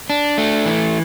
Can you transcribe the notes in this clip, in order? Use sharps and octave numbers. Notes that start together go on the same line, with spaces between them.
D4
A3
E3